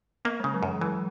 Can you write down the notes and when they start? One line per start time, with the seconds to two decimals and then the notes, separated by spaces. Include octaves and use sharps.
0.25 A#3 B3
0.40 G#3
0.44 C#3
0.54 F#3
0.63 F#2 E3
0.81 E3 F#3